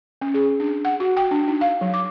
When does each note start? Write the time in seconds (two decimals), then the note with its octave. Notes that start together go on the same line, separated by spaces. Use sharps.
0.22 C#4
0.34 G#4
0.60 D4
0.85 F#5
1.00 F#4
1.17 G5
1.31 D4
1.48 D#4
1.61 F5
1.81 F#3
1.94 D6